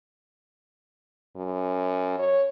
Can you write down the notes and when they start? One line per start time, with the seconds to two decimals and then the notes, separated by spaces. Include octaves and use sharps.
1.36 F#2
2.19 C#5